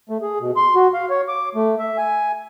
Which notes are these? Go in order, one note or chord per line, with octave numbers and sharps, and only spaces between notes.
A3
G#4
B2
C6
F#4
F5
C#5
D6
A3
E5
G#5